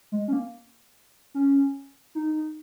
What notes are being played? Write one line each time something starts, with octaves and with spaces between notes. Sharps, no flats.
G#3
C#4
A#3
C#4
D#4